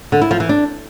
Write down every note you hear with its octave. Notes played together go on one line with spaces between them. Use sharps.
D3
E4
F3
E3
D4